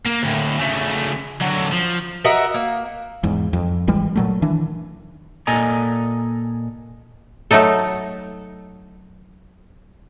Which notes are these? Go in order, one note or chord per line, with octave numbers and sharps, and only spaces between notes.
A#3
D2 A2
C#3 A3
D3 F#3
F3
F#4 A#4 D#5 E5
A#3
E2 G#2
F2
G#1 E3 G3 G#3
A#2 F#3 A3
D#3 E3 D4
A#2 A4 D#5 G#5 A#5
F#3 A3 D#4 A4